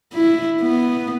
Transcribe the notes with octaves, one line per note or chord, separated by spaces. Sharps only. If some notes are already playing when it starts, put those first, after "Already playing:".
E4
B3